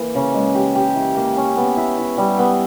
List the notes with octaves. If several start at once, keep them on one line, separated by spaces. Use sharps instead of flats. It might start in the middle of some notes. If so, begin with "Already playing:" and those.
Already playing: E3 A#3
C#3
G#3
G4
G4
E4
A#3
C#4
B3
E4
E4
G3
B3